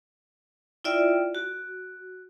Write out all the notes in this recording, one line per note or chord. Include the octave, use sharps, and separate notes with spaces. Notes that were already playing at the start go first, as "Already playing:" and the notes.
E4 F4 D5 E5 G5
F#4